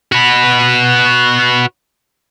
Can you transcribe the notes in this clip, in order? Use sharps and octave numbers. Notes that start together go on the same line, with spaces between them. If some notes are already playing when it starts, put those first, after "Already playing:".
F#4 B4